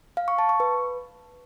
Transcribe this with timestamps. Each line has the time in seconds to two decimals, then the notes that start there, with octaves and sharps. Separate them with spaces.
0.17 F5
0.28 C#6
0.38 A5
0.49 C#6
0.60 B4